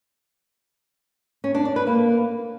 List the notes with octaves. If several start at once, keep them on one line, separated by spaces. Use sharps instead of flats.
C#4
D4
D5
B4
A#3